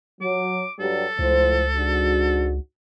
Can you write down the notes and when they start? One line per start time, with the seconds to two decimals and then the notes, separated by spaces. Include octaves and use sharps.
0.21 F#3 D6
0.79 G2 F#3 G3 A4
1.19 C#2 A2 F3 C5
1.76 G#2 D4 F#4